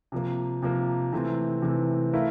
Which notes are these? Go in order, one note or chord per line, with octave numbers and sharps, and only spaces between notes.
C3 F3 A#3
C3 F3 A#3
C3 E3 A3 C4
C3 E3 A3 C4
A3 E4 A#4 F5